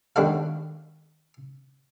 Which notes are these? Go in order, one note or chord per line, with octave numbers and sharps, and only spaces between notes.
D#2 G3 D4 F#4 A4 F5